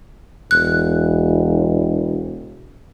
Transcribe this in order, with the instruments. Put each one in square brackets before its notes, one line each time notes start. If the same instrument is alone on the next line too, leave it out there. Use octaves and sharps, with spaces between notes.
[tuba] E1 [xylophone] F#6